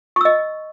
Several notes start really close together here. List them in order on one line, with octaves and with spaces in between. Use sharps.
C#6 E6 D#5